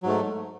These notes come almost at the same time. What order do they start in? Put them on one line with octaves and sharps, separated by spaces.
F#3 G#2 A3